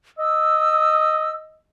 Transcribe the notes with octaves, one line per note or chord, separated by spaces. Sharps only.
D#5 E6